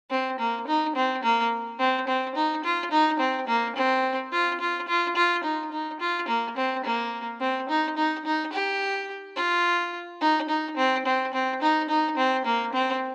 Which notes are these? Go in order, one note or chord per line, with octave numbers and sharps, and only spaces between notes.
C4
A#3
D#4
C4
A#3
C4
C4
D#4
F4
D#4
C4
A#3
C4
F4
F4
F4
F4
D#4
D#4
F4
A#3
C4
A#3
C4
D#4
D#4
D#4
G4
F4
D#4
D#4
C4
C4
C4
D#4
D#4
C4
A#3
C4